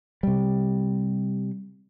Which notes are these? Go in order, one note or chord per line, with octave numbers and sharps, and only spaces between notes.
C3 G3